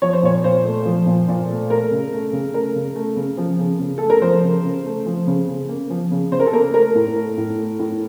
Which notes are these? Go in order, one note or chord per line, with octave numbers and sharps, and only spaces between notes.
F3 C#5
C5
A#2 C#5
A#2 C5
A3
F3
A#2
A#2
A3
A3 A#4
C#3
A3
C#3
A3 A#4
C#3
A3
C#3
F3
C#3
C#3
A3 A4
A#4
F3 C5
C#3
C#3
A3
F3
C#3
C#3
A#3
F3
C#3
C#3 C5
A#4
A4
A#3 A#4
A3 A#4
A2
A3
A2
A3
A2